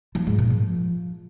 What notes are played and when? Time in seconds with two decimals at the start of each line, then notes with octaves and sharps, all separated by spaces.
0.15 F3
0.27 G#2
0.38 A#2
0.50 F3